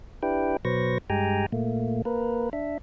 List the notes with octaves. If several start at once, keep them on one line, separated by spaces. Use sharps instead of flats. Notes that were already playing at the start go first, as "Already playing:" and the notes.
D4 E4 G4 B4 G5
B2 F#3 B4 C5 C#6 A#6
G2 G#3 G4 G5 G#5 A#5
A#2 A3 A#3
A#3 A#4 B4
D4 E5